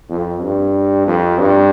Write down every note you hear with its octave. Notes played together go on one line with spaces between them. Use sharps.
F2
G2
F2
G2